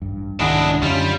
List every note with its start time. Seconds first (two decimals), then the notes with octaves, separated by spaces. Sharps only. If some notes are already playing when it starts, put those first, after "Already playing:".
0.02 A1 G2
0.40 C2 G#2 D#3 D4 E4 G#4 D#5 F#5
0.83 F#2 D3 G3 C#4 D#4 F4